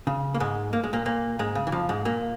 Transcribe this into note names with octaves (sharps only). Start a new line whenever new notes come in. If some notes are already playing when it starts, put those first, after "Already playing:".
C#3
A#3
G#2 G#3
A#3
G#3
A#2 A#3
A#2 A#3
G#2 G#3
C#3
E3
F2 F3
G#2 G#3
A#2 A#3